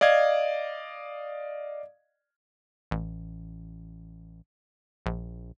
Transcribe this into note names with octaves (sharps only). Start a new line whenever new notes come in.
D5 D#5 F5 G#6
A1
A#1